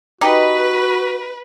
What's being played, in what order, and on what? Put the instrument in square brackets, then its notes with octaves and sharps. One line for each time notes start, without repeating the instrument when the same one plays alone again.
[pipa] D#4 G4 D#5 [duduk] F#4 [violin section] B4